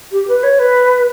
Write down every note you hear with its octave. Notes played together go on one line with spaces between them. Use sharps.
G4
B4
C#5
B4